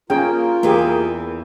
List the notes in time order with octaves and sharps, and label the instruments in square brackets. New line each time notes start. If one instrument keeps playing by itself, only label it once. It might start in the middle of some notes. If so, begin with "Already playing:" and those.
[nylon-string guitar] A#3 [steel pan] C#4 G#4 G5 [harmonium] F4 A#4
[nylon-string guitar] E2 E3 [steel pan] A#3 G4 G#4